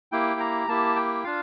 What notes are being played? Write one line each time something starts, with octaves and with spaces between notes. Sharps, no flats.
A#3 E4 G4 G5
A#5
A#3 E4 G4 A5
G5
D4 F4 F5